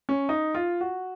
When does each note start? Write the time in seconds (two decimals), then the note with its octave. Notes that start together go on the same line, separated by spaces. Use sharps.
0.09 C#4
0.29 D#4
0.55 F4
0.81 F#4